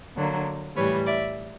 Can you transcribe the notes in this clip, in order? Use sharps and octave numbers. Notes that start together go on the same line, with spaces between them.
D3 F#3 A#3
A2 E3 G3 B4 C#5
D5 E5